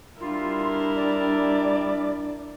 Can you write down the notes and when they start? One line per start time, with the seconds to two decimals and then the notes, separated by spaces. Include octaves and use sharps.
0.20 G3 D4 E4 F4 A#4
0.96 D5